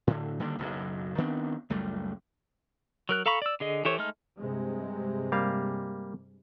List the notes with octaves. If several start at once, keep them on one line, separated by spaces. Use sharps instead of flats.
A2 D3
D3 D#3 G3 A#3
F#1 B1 F#2
D#3 B3 C4 D4
C#2 F#2 G3 A3
F#3 A#4 F#6
A4 F5 A#5 B5 C#6
D5 E6
D3 G#4 D#5
E3 G4 A4 C5 C#5
G#3 A3 D#4 F6
G2 C3 G#3
G3 A#3 F5